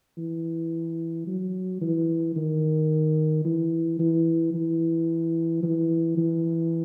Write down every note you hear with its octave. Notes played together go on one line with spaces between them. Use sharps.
E3
F#3
E3
D#3
E3
E3
E3
E3
E3